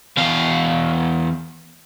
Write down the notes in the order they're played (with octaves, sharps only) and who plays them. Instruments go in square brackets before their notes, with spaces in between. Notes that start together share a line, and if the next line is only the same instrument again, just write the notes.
[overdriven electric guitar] E2 F5